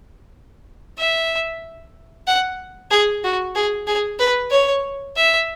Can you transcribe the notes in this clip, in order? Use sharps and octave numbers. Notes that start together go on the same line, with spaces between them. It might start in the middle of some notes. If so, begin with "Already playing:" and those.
E5
F#5
G#4
F#4
G#4
G#4
B4
C#5
E5